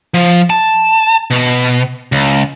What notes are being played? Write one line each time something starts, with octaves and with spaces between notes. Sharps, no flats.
F3
A5
B2
C#2